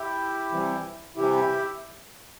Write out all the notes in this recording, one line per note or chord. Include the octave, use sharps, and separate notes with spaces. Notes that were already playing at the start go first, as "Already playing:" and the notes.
Already playing: E4 G4
C3 E3 G3
C3 E3 G3 E4 G4